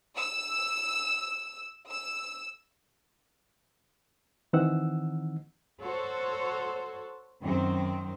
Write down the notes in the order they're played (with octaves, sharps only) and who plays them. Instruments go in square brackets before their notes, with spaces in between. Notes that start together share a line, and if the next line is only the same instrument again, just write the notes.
[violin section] E6
E6
[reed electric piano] D#3 E3 C4 D#4 F#5 E6
[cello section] F#4 A4 C5 C#5
F#2 D#3 C4